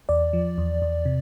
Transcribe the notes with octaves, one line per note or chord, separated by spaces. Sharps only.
E2 D5
F3
E2
E2
C3